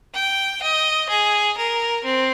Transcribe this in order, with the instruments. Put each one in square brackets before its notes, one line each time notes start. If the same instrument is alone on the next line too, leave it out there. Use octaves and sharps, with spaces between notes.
[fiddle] G5
D#5
G#4
A#4
C4